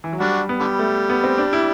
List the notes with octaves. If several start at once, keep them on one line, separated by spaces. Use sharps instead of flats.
E3
F#3
G3 D4 F#4
B3
D3 G3
A3
B3
C4
D4
E4